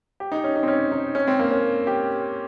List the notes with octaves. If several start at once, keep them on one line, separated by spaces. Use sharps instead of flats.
G4
D#4
C#4
D#4
C4
C#4
D#4
C#4
C4
A#3
C#4
G4